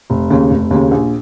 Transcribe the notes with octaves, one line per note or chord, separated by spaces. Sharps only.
F1
D#2 C#3
F1
D#2 C#3
A#1